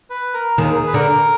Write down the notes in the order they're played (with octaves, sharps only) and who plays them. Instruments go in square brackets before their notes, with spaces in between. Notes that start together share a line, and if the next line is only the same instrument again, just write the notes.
[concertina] B4
A#4
[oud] D#2 D#3 [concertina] G#4
[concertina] B4
[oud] D3 [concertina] A#4